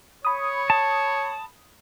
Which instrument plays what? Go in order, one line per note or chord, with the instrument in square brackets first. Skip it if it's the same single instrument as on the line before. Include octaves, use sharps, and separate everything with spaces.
[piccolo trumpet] C#5 [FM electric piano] B5 D#6
[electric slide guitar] A5